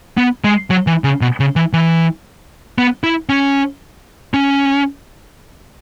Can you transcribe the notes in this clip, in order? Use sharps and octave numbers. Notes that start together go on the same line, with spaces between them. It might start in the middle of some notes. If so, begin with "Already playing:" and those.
B3
G#3
F#3
E3
C#3
B2
C#3
E3
E3
B3
E4
C#4
C#4